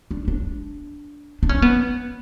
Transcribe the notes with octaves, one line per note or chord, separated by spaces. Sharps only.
D4
D4
D4
C#4
B3